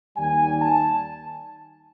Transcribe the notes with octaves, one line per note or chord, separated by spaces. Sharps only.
D#2 D#3 G3 G#5
A5